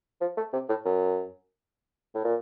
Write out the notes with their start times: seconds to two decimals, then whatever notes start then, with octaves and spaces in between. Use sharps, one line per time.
0.21 F3
0.37 A3
0.53 C3
0.69 A2
0.85 F#2
2.14 A2
2.24 A#2